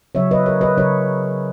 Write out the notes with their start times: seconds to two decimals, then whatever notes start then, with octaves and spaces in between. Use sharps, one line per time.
0.15 C#3 F#3 C#4 C#5 E5
0.31 B4 D#5
0.46 A#4 C#5
0.61 B4 D#5
0.77 C#3 F#3 C#4 A#4 C#5